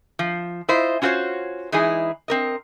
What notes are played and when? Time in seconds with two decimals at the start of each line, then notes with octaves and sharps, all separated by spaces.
0.19 F3
0.68 E4 F4 C5 D#5
1.02 C#4 F4 F#4 A4 C5 C#5
1.72 E3 G#3 D#4 E4 G#4
2.28 C4 A#4 D#5